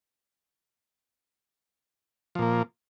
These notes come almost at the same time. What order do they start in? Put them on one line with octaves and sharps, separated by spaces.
F3 A#2 A#3